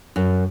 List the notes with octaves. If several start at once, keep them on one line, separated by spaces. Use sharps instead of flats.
F#2